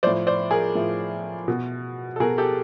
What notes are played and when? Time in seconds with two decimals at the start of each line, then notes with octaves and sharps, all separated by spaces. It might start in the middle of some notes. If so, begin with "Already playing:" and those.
0.03 A2 F3 C5 D5
0.27 C5 D5
0.51 G#4 A#4
0.75 A2 F3
1.48 B2
2.16 A4
2.20 B2 G#4 A#4
2.38 G4 A4